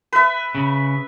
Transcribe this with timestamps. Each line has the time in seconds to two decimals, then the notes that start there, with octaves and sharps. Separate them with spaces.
0.13 B4 E5
0.55 C#3